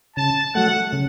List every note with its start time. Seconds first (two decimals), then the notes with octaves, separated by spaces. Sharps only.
0.17 C#3 A5
0.55 F#3 A3 F#5
0.93 C#3